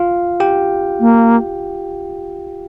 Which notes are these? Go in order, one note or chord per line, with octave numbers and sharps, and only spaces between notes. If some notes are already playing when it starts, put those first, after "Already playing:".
Already playing: F4 F5
G4 G5
A#3